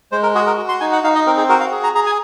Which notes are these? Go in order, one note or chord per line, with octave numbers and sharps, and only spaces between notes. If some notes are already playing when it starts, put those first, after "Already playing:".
G#3 C5
A#4
F#4 G#4
A#4
F#4
C6
D#4 G#5
F#5
D#4 F5
D#5
C4 A#4
G#4
F#4 A#4
F5
G#4
A#5
G#4 A#5
G#5